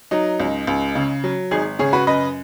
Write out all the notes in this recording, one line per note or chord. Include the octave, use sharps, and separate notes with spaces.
F#3 D#4
C#2
C#2
C#3
F#3
G#1 D#4 G#4
C#3 G#4 C#5
F#4 B4
F#2 B4 D#5